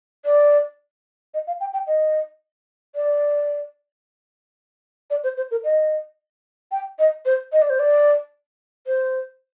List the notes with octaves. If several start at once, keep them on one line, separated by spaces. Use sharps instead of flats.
D5
D#5
F5
G5
G5
D#5
D5
D5
C5
C5
A#4
D#5
G5
D#5
C5
D#5
D5
C5
D5
C5